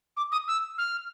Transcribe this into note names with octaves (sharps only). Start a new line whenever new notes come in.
D6
D#6
E6
F6